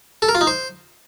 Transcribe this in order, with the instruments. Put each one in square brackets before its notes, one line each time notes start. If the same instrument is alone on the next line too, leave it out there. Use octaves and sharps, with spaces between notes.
[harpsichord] A4
A#4
F4
D#4
C5